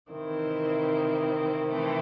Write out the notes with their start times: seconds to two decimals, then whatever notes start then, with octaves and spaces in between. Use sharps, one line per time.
0.11 C3 D#3 E3 C4 E4
1.67 C3 E3 A3 C4